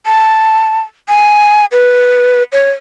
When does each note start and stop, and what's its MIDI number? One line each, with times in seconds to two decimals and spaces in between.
0.06 0.81 81
1.08 1.65 80
1.72 2.43 71
2.52 2.71 73